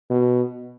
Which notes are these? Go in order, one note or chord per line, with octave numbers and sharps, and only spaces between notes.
B2